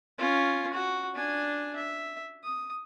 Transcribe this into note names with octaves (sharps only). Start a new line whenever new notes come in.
C#4 F4
F#4
D4 G#5
E5
D#6